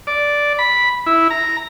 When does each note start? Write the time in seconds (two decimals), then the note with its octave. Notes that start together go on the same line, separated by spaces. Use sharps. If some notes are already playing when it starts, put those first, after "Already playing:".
0.07 D5
0.59 B5
1.06 E4
1.30 A#5